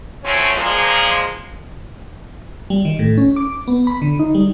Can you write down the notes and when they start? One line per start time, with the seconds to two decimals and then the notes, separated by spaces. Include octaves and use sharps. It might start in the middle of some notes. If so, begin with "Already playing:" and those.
0.24 F3 F#3 A3 C4 C#4
0.56 A#2 F3 G#3
2.70 G3
2.85 D#3
2.99 A2
3.17 C#4
3.36 D6
3.67 B3
3.87 B5
4.02 D3
4.19 D#4
4.35 G3